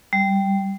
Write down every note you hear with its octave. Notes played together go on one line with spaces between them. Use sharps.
G3